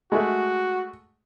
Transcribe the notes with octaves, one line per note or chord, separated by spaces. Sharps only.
G#3 A3 F#4